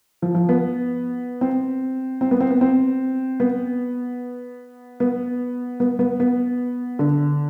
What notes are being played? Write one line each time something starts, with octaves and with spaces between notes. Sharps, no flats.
F3
F3
B3
C4
C4
B3
C4
B3
C4
B3
B3
B3
B3
B3
D3